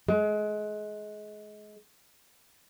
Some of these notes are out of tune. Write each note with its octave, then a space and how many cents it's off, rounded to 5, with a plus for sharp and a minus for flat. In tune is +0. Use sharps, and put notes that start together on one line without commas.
G#3 +25